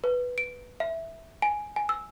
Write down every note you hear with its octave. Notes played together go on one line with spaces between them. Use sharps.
B4
D7
E5
G#5
G#5
E6